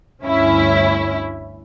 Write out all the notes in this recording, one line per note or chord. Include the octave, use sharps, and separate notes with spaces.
D2 G2 C#4 E4 E5